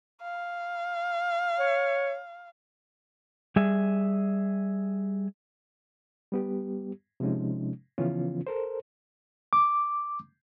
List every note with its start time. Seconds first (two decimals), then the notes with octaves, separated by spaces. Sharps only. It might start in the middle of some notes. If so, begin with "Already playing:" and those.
0.22 F5
1.59 C#5
3.56 G3 G#4 E5
6.32 G3 B3 G4
7.20 C3 F3 G#3 C#4 D#4
7.98 C#3 E3 F3 B3 C#4 F4
8.47 A4 A#4 C5
9.53 D6